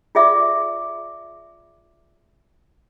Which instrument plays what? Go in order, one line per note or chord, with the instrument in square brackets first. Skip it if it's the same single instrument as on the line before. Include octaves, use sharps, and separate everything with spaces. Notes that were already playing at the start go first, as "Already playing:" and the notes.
[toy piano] F4 G#4 D5 E5 D6